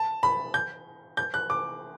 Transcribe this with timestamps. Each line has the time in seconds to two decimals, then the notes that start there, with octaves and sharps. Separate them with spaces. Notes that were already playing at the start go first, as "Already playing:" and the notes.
Already playing: A5
0.23 B5
0.54 G6
1.17 G6
1.34 F#6
1.50 D6